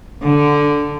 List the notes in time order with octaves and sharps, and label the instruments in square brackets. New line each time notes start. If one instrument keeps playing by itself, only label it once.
[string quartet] D3